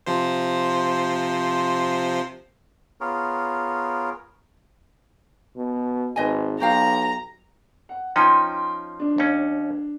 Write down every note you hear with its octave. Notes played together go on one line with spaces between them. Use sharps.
C3 F3 C5
B3 F4 G#4 A#4 C#5
B2
G#1 B4 D#5 G#5
B1 F#4 G4 F5 A#5
F#5
F3 C#4 D#4 G5 A#5 C6
D4
D#2 C#4